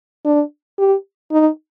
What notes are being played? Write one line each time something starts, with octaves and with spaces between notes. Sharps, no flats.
D4
G4
D#4